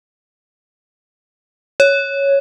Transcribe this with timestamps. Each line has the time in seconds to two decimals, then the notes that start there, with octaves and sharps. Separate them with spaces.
1.80 C#5